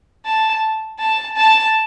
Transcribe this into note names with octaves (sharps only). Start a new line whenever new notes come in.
A5
A5
A5